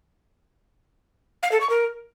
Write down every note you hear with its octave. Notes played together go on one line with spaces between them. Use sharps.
F5
A4
C#6
A#4